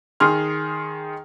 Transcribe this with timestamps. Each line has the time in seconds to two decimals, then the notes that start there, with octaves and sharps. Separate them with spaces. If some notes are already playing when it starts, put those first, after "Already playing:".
0.20 D#3 G#4 C6 F6